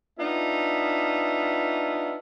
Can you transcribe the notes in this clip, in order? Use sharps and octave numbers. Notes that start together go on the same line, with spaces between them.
B3 D4 D#4 F4 E5